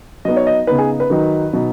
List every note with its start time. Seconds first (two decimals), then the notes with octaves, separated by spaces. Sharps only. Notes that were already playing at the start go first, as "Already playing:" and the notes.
0.25 F#3 B3 D#4 D#5
0.36 C#5
0.47 D#5
0.67 C#3 B3 D#4 B4
0.78 G#4
1.00 B4
1.10 D#3 F#3 D#4
1.53 B2 F#3 D#4